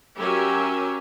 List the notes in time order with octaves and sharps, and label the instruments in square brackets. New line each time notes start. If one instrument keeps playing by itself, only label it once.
[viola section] F#3 C#4 G4 A#4 E5 G#5